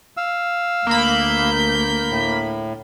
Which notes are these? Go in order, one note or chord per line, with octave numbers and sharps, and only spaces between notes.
F5 E6
D2 A#3 B5 G6
A2